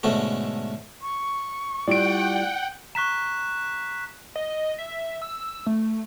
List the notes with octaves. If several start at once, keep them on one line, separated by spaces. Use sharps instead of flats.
G#2 B2 D3 A3 C#4
C#6
G3 E4 F4 D5 F#5 G5 D7
A#5 C#6 F#6 B6 E7
D#5
E5
E6
A3